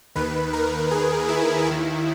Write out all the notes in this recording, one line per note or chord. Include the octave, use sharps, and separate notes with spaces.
D#2 D#3 B4
A#4
G#4
E4
D#2 D#3 E4